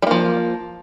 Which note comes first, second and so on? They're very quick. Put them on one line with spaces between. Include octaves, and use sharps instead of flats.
G3 A#3 F3